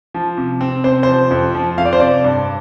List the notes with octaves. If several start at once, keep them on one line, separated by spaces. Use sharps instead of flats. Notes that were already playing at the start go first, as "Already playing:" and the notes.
F3
C3
C4
C3 C5
F3 C5
F2
F3
F2 F5
D5
C5
C3 D5
G2